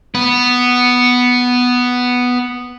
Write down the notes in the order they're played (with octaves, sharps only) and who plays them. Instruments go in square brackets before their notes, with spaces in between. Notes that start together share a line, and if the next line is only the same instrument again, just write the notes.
[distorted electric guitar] B3 B4